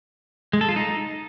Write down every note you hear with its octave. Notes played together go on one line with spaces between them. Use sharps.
G#3
A4
F4
D#4